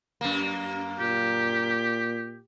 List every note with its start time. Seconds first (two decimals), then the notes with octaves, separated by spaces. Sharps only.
0.21 F#2 A#3
1.00 A#2 G4